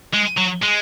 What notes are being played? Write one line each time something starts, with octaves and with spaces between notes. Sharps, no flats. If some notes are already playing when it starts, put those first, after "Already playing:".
G#3
F#3
G#3